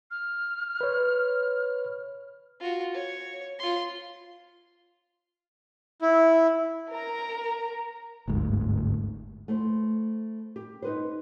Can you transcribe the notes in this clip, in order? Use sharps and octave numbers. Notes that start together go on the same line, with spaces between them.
F6
B4 C#5
F4 F#4
C#5
F4 C6
E4
A#4 A#5
G1 D2 G#2
A3 E4 C5
G4
D#4 B4 C5